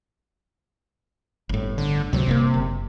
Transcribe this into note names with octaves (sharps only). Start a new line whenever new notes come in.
G1 A2
D3
C#2 C3 F#3
G1 B2 A#3
F#1